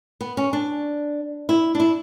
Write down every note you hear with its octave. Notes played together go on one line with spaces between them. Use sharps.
B3
C#4
D4
E4
D4
E4